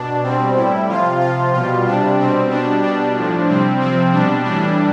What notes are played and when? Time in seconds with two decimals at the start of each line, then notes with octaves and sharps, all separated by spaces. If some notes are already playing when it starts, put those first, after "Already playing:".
Already playing: B2 D4
0.23 B2 G3 C4
0.56 A2 G3 E4
0.88 C3 F3 F4
1.20 C3 F3 F4
1.53 B2 G3 F4
1.86 C3 G3 D4
2.18 B2 G3 C4
2.50 B2 G3 D4
2.83 B2 G3 D4
3.16 A2 F3
3.48 C3 G3 C4
3.80 C3 F3 C4
4.12 B2 G3 D4
4.45 A2 E3 G3 D4